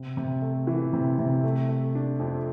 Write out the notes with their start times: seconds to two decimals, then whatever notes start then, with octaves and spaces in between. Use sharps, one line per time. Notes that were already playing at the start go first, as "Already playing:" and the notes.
Already playing: C3
0.17 C3
0.42 A3
0.67 E3
0.93 C3
1.18 C3
1.44 A3
1.69 A3
1.95 D4
2.20 F2